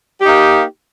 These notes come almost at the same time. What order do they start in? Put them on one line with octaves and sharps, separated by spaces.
G4 D#4 A#3